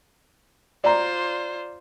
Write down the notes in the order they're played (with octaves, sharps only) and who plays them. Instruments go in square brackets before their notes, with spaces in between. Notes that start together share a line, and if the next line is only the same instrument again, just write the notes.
[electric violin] F4 C5 [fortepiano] D5 A#5